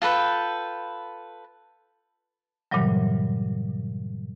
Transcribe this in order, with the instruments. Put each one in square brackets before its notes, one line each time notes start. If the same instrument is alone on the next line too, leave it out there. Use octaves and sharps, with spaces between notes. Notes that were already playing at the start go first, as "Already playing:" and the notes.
[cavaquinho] F4 A4 B4 G5
[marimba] G2 A#2 C#3 E3 F#3 G3